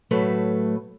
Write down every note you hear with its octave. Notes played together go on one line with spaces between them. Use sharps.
A2 F#3 A3 B4